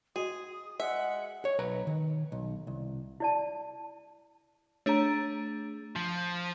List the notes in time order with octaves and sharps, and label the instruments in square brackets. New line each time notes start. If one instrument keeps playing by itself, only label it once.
[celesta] F#4 D#5 [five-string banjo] G#4 [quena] D#6
[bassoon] G#3 [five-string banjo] E5 [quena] F#5
[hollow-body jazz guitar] C#5
B1 B4 A#5 B5
D#3
B1
C2
[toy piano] E4 D5 A5
[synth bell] A3 D4 G#4 [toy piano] C#5 A#5
[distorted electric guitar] F3